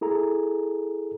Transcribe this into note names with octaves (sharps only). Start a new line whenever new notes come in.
E4 G#4 A4 A#5